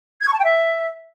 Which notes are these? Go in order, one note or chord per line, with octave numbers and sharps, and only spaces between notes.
G#6
C#6
A5
G5
E5